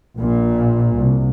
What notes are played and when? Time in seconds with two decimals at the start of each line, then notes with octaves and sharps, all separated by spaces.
0.18 A#1 A#2
0.96 C2